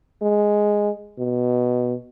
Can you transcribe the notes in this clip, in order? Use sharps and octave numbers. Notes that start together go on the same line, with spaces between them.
G#3
B2